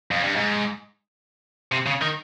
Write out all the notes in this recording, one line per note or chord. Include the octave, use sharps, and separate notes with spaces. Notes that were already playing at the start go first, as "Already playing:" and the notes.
F2
G2
G#2
C3
C#3
D#3